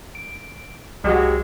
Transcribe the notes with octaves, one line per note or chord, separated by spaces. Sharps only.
D7
C2 F#3 G#3 F#4 G4